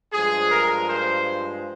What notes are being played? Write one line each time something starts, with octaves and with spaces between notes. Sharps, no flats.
G2 F3 G#3 G#4
A#4
C5